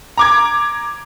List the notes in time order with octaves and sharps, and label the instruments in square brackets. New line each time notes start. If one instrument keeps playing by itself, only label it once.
[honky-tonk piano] A#5 D6 G#6